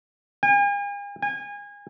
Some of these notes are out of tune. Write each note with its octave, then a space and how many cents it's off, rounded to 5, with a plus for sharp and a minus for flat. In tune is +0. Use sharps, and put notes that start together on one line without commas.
G#5 -45
G#5 -30